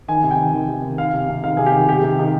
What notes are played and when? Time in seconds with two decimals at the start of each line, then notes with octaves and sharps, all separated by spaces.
0.08 D#3 G#5
0.23 C3
0.31 G5
0.38 D#3
0.53 D#3
0.69 C3
0.83 D#3
0.98 D#3 F5
1.14 C3
1.29 C3
1.43 D#3 F5
1.57 C3 G#4
1.66 G4
1.74 D#3
1.89 C3 G4
2.03 C3
2.19 D#3